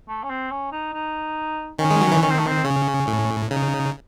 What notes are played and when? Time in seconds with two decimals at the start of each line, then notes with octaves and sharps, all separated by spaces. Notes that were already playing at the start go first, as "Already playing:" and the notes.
0.08 A3
0.23 C#4
0.29 C4
0.51 C#4
0.72 D#4
0.93 D#4
1.79 D#3 C#4
1.90 G#3
2.01 F#3
2.11 E3
2.21 D#3 C#4
2.30 C4
2.38 A3
2.46 C4
2.65 C#3 C#4
3.07 A2
3.50 C#3 D#4